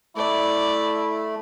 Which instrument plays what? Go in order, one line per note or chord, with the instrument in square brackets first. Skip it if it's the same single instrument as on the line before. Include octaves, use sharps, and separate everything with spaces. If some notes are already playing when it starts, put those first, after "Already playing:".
[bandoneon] A3 [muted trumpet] E4 [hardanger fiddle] D5